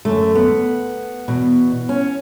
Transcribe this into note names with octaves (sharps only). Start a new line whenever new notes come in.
F#2 D3 A3
B3
E2 B2
C#4